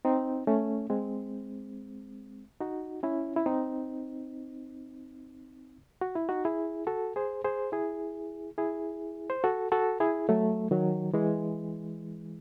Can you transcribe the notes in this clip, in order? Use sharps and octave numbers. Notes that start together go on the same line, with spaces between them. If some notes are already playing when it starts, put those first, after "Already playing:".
C4 D#4
A3 C#4
G#3 C4
D#4 F#4
C#4 E4
E4
C4 D#4
F#4
E4
D#4 F#4
E4 G#4
F#4 A4
G#4 C5
G#4 C5
E4 G#4
E4 G#4
C5
F#4 A4
F#4 A4
E4 G#4
F#3 A3
D#3 F#3
E3 G#3